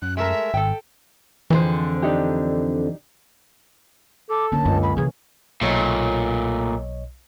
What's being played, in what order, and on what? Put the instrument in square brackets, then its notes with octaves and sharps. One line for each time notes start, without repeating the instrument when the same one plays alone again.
[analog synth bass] F#2 [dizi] F#6
[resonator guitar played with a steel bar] G#3 A3 A#4 [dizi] E5
[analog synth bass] G#1 [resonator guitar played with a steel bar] A4 G5
[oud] F2 D3 [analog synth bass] E3 [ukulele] G#4 C5
[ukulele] D4 D#4 G4
[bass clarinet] A4 [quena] D6
[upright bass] D2 [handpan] D3 A#3 C#4 [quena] A5
[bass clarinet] C#2 [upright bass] F#2 G#3 [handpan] C#4
[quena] B5
[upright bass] C3 E3 [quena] G#4
[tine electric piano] B1 C#5 D#5 [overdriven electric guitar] A#2 A3